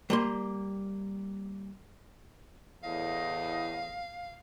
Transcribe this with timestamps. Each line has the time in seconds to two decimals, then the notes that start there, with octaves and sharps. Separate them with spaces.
0.10 G3 A#3 C6
2.83 E2 A2 D#5 F5